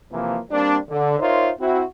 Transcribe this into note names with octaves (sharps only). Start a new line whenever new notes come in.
C3 E3 F3 A#3
G3 A#3 C4 D4
D3
D#4 F4 A#4 C5 C#5 E5
C4 E4 F#4